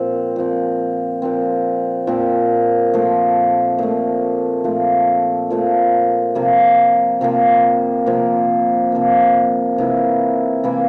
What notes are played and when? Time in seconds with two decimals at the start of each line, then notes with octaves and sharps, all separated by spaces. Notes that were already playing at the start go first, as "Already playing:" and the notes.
Already playing: A#2 F3 C4
0.36 A#2 F3 C4
1.22 A#2 F3 C4
2.07 A#2 F3 C4
2.94 A#2 F3 A3
3.78 A#2 F3 A3
4.64 A#2 F3 A3
5.50 A#2 F3 A3
6.35 C3 F3 A#3
7.21 C3 F3 A#3
8.06 C3 F3 A#3
8.92 C3 F3 A#3
9.78 C3 E3 A#3 E4
10.64 C3 E3 A#3 E4